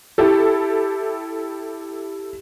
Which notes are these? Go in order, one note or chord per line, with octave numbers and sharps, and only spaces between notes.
E4 G4 A4